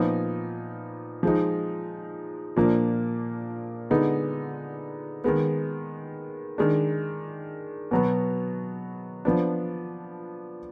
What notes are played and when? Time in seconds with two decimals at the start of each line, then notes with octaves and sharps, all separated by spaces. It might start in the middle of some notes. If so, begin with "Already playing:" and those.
Already playing: A#2 F3 B3 D#4
1.23 F3 G#3 D#4
2.56 A#2 F3 A#3 D4
3.90 D3 G#3 B3 D#4
5.24 D#3 G#3 B3
6.58 D#3 G#3 D4
7.91 B2 F#3 B3
9.25 F3 B3 D4